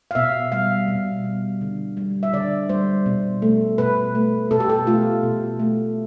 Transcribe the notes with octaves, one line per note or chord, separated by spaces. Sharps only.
F5
B2 E5
G3 F5
B2
G3
D3
G3
E5
D3 D5
G3 C5
B2
A3
B2 B4
A3
B2 A4
G4
A4
A3 F4
B2
A3